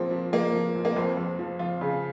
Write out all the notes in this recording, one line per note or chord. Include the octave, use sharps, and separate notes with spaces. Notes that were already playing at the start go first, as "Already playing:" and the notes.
Already playing: A#2 F3 A#3 C4
F3
F3 A#3
F3
A#2
A#3
F2 C4
F2
F3
F3 F4
C#3